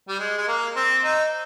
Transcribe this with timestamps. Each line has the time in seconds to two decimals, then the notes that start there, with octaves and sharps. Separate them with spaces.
0.08 G3
0.19 G#3
0.38 G#3
0.48 A#3
0.76 C4
1.04 D#4